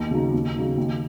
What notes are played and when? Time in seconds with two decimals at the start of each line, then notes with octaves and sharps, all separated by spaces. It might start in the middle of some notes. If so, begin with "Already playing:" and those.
Already playing: D#2
0.11 C#3 F#3 D#4
0.34 D#2
0.56 C#3 F#3 D#4
0.77 D#2